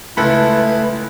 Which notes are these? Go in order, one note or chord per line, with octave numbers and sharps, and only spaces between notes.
C#2 A3 E4 A4 B4 B5